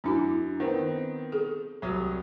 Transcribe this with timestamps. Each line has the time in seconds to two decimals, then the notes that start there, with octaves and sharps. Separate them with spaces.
0.04 F#2 D4 E4 F#4
0.60 D#3 B3 C4
1.32 G#4 A4
1.82 C2 F#3 D#6